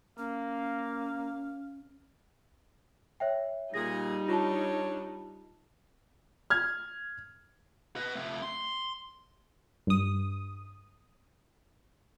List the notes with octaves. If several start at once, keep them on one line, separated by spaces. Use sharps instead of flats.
A#3 C#4 F5
C#5 E5 G5
A#2 G3 D#4 G#4 A#6
D4 F4 C#5 A5
F6 G#6
B4 D#5
A3 C4
C6
G2 D#6